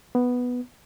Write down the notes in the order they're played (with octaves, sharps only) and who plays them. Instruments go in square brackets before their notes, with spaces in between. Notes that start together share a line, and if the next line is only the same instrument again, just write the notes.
[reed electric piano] B3